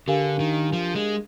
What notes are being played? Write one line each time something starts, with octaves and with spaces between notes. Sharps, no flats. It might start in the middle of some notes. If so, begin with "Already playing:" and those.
D3 D4 G4 A#4 F5 G#5
D#3
F3
G#3